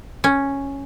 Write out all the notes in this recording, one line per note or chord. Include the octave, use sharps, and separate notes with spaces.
C#4